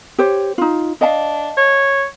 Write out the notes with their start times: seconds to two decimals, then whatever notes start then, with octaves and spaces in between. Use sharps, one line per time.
0.19 G4 C5 C#5
0.58 D#4 F4
1.01 D4 D#5 F5 A5
1.57 C#5